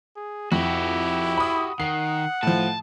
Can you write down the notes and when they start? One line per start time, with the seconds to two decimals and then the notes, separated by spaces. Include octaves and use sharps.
0.16 G#4
0.52 F2 E4 F#4 G4
1.37 B5 D#6
1.80 D#3 F#5 C7
2.43 A2 F3 A5